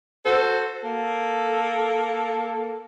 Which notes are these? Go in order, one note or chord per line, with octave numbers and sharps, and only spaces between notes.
F#4 A4 C5
A#3 A4